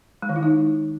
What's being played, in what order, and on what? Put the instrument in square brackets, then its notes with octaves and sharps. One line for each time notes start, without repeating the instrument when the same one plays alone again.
[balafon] G#3
D#3
E4
D#4